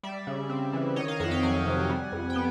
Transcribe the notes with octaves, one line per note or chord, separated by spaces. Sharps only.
G3 D5 E5
C#3
C4
E3
D#3 C#5 D#5
D#5 F5
F2 E5 F#5
F5 G5
F#3 F#5 G#5
C3
G3
F2
G5
B3